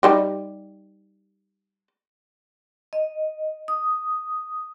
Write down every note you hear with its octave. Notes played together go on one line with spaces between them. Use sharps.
G3 D#4 G4
D#5
D#6